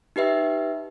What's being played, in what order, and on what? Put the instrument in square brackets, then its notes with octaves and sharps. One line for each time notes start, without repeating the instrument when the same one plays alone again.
[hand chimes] D#4 G4 B4 E5